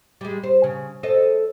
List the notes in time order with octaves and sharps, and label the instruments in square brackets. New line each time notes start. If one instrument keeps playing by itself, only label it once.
[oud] G3 G#3
C5
C#3
A4 C5 D#5